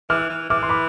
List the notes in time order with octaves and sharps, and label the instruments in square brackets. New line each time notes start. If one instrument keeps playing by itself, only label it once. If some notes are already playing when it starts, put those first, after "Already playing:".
[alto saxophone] E3 [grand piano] D6 F6
[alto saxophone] E3
[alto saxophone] E3 [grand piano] D6 F6
[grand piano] C6
B5 D6